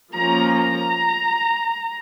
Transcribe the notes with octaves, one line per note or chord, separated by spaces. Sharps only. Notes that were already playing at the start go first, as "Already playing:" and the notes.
F3 A#3 C#4 A#5
A#5